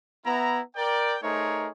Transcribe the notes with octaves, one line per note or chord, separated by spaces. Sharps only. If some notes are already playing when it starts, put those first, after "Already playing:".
B3 E4 A#5
A#4 D5 G5
A3 D#4 G#4 A#4 C5 C#5